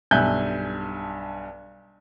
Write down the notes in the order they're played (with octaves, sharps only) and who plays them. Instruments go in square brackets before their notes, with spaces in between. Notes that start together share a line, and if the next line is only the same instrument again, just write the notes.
[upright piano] B1 G2 E5 G#5 F#6 G6